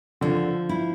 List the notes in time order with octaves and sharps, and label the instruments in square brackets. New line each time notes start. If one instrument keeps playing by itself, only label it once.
[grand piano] D3 [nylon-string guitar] F3
[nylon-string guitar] E4